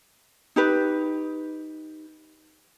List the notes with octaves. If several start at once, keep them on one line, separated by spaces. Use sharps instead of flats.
D#4 G4 B4